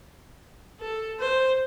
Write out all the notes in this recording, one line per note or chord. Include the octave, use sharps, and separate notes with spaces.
A4
C5